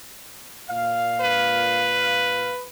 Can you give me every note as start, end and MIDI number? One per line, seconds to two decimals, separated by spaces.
0.69 2.53 46
0.69 2.53 77
1.21 2.66 71